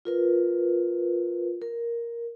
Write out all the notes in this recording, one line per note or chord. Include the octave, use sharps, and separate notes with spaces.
F4 A#4 B4
A#4